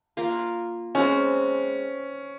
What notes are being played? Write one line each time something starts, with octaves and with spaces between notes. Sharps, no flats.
A#3 F4 A#4
G#3 C4 C#4 F#4 A#4